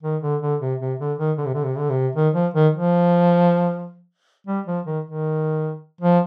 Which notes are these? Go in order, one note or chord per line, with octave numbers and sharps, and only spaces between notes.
D#3
D3
D3
C3
C3
D3
D#3
D3
C3
D3
C3
D3
C3
D#3
F3
D#3
F3
G3
F3
D#3
D#3
F3